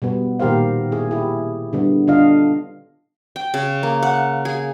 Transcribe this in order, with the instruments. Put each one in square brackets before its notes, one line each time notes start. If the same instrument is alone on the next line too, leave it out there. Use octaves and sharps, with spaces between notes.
[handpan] B2 G3 B3
A#2 D#3 G4 A#4 C5 F5
E4 G#4
E4 G4
D3 G3 B3
D3 D4 F4 D#5 F5
[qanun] G5
C#3
A#3
F#5
G#4